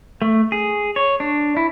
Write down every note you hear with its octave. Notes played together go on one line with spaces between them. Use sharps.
A3
G#4
C#5
D4
E4